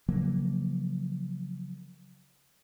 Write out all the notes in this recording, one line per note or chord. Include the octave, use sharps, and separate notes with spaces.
C#3 F3 F#3 A#3